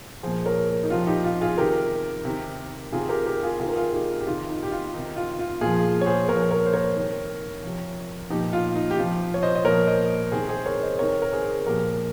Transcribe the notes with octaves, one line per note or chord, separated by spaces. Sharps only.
A#2 F3 G#4 C5
A#4 C#5
D#4
C3 F3 F4
D#4 G4
F4
F4 G#4
C3 D#3 G4 A#4
C3 D#3
C3 D#3 F4 G#4
G4 A#4
G4 A#4
F4 G#4
C3 D#3 F4 G#4
A#4
F4 G#4
D#4 G4
G4
C3 D#3 F4
D#4
G4
F4
C3 D#3 D#4
F4
F4
A#2 F3 F4 G#4
C#5
G#4 C5
A#2 F3 A#4 C#5
A#4 C#5
C5
A#4 C#5
C3 D#3
C3 F3
A#2 F3 D#4 G4
F4
D#4
G4
C3 F3 F4
C#5
C5 D#5
D#5
A#2 F3 A#4 C#5
C5 D#5
C3 D#3 G#4 C5
G#4 C5
A#4 C#5
C5 D#5
C3 D#3 A#4 C#5
A#4
G#4 C5
A#2 F3 G4 A#4